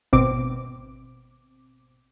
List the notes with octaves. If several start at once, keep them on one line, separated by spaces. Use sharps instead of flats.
G#1 B2 C4 D6